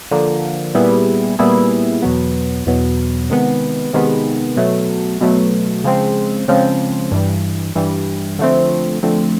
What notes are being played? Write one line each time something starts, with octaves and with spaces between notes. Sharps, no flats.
D3 F3 A#3
A#2 G3 B3 E4 G#4
A#2 G3 B3 E4 G#4
E2 B2 F#3 B3
E2 B2 F#3 B3
C3 D#3 G#3 B3
C3 D#3 G#3 B3
B2 F#3 A3
B2 F#3 A3
C#3 F3 G#3 C4
C#3 F3 G#3 C4
G2 E3 G3
G2 E3 G3
D3 F3 A3 C4
D3 F3 A3 C4